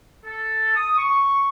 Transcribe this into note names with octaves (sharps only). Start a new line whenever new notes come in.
A4
D#6
C#6